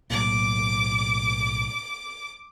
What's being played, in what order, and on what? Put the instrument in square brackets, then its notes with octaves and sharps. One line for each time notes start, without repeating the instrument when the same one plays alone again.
[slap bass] B1 A2 A#3 [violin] D6